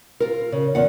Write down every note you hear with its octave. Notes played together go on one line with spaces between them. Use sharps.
F4 A#4
C#3
E2 F#5